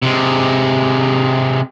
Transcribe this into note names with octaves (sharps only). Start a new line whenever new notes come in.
C3 G#3